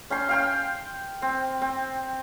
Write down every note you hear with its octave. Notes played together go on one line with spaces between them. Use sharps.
C#4 G5 C6
F5 G5 C6
C4
C4